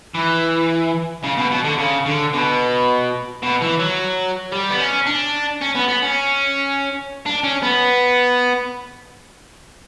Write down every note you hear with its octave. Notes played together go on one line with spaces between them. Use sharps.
E3
C#3
B2
B2
D3
C#3
D3
B2
B2
E3
F#3
G3
B3
C#4
D4
C#4
B3
B3
C#4
D4
C#4
B3